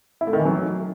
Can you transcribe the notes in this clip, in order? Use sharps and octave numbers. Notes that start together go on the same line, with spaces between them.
E4
A3
D#3
E3
F#3